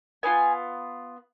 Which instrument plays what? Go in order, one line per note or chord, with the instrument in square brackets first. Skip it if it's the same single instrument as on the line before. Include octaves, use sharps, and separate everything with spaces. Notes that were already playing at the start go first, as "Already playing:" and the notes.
[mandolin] B3 D4 F4 G#5